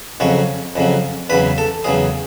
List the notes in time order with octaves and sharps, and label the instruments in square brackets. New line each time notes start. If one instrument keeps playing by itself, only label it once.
[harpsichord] F2 C#3 F#3 C#5
F2 C#3 F#3
E2 C#3 F#3 B4
A4
E2 C#3 F#3 G#4